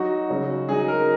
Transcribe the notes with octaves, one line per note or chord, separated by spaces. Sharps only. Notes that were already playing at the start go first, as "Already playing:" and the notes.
Already playing: F#3 D#4 F#4
C#3 F#3 C#4
F#3 D#4 G#4
A#4